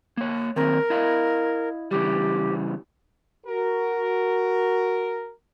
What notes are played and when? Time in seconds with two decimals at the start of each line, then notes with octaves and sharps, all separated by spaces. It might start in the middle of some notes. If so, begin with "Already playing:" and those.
0.17 A#3 C#5
0.56 D#3 A#3 C4 A#4
0.90 E4 D#5 F5
1.91 C#3 E3 G3 G4
3.46 F#4 A#4